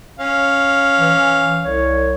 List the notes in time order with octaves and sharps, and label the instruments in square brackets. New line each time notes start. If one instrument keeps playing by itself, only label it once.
[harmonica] C#4 F5
[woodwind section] E3
C2 C#5